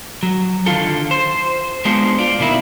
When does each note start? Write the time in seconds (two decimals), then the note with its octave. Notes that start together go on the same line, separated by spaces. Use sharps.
0.23 F#3
0.66 D3 D#3 F4 A4
1.11 C5
1.85 G#3 B3 D4 F4 C5
2.19 F4 D5
2.39 B2 D#3 A#3 E4